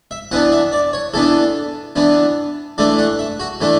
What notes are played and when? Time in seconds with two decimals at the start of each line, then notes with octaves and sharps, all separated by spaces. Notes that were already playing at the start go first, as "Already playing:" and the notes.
0.11 E5
0.31 E3 B3 D4 F#5
0.52 E5
0.72 D5
0.93 C#5
1.14 E3 B3 D4 A4
1.96 E3 B3 D4
2.78 E3 A3 D4 D5
2.99 F#5
3.19 E5
3.40 F#4
3.61 E3 A3 D4